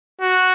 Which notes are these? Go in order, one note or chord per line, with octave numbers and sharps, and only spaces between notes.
F#4